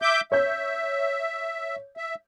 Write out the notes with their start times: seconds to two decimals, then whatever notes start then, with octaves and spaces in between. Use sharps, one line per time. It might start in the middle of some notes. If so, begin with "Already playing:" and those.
0.02 E5 D6 G6
0.32 C#5 E5 G6
1.97 E5